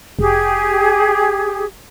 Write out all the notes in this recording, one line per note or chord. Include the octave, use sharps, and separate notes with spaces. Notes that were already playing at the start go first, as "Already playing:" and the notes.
F1 G4 G#4